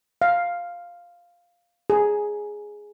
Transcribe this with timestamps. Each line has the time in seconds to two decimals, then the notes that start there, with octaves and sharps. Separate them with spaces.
0.22 F5
1.90 G#4